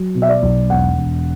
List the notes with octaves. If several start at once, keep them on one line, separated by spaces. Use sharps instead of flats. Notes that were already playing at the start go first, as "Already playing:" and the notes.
Already playing: F#3
B2
E5
D5
B1
E1 F#5
E1